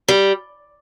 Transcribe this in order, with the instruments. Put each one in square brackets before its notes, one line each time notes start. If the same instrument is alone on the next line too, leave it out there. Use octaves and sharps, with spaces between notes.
[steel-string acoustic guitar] G3